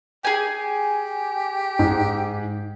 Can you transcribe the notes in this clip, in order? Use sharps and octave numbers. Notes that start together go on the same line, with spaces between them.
G4 G#4 G#5
G#2